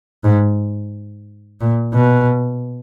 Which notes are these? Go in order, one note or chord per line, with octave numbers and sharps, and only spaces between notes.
G#2
A#2
B2